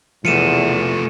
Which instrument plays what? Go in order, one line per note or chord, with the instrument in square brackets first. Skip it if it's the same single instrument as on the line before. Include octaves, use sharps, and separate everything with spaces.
[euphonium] E2 [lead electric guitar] F3 A3 [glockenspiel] C#7 D#7 E7